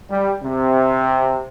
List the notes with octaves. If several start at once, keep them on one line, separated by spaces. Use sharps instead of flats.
G3
C3